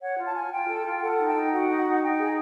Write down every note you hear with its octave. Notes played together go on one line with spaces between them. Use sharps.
C#5 F#5
F4
A5
F4 G#5
F4 G5
A4
F4
G5
A4 F#5
D#4
G5
D#4
F#4 F#5
D#4
D#4
D#4 G5
G#4